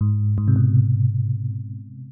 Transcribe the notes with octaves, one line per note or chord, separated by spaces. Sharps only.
G#2
G#2
C3
B2